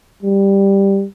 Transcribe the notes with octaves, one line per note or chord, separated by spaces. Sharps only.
G3